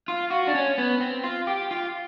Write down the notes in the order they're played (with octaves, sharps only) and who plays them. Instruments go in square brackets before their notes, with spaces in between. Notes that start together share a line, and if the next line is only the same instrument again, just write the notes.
[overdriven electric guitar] F4
F#4
D4
C#4
B3
C4
F4
G4
F4